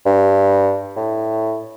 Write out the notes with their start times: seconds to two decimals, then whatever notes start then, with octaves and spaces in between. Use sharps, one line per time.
0.06 G2
0.97 A2